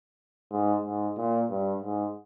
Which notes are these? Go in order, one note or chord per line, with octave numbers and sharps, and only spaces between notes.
G#2
G#2
A#2
G2
G#2